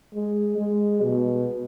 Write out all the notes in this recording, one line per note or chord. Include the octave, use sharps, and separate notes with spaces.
G#3
G#3
B2